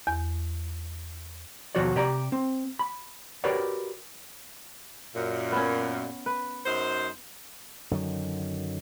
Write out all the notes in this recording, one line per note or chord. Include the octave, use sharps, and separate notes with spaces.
E2
D#2 B2 F3 F#4 C#5 D5
C3 G4 D5 A#5
C4
B5
F#4 G4 A#4 B4 C#5 D5
F#2 A#2
B3 C#4
B4
F#2 D#4 C5
F#2 D3 D#3 F#3